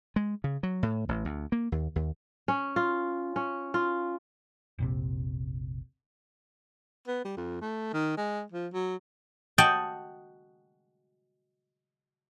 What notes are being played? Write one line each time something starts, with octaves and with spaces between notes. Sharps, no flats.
G#3
C#3
F#3
A2
A1
D2
A#3
D#2
D#2
C#4
F4
C#4
F4
F1 A#1 C3
B3
G3
F2
A3
D#3
G#3
F3
F#3
F#4 D#5 G5 A5